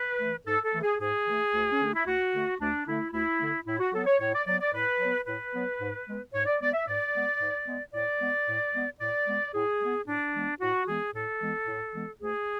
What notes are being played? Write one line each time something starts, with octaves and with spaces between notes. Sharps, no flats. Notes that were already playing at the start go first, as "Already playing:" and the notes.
Already playing: B4
E3 A3
G#2 A4
A4
E3 A3
G#4
G#2 G#4
E3 A3
D2
C#4
D3 A3 D4
E4
D2 F#4
D3 A3
D2 D4
D3 A3 E4
D2 E4
D3 A3
A2 E4
F#4
F#3 B3 A4
C#5
A2 C#5
D5
F#3 B3 D5
D5
A2 B4
F#3 B3
A2 B4
F#3 B3
G#2
G#3 B3
G#2 C#5
D5
G#3 B3 D5
E5
G#2 D5
G#3 B3
G#2
G#3 B3
A2 D5
G#3 B3
A2
G#3 B3
A2 D5
G#3 B3
A2 G#4
G#3 B3
A2 D4
E3 G#3 B3
A2 F#4
E3 G#3 B3 G#4
A2 A4
E3 G#3 B3
A2
E3 G#3 B3
D2 G#4